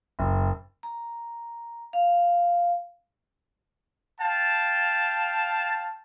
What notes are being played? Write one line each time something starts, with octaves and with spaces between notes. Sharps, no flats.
F#1
A#5
F5
F5 G5 A5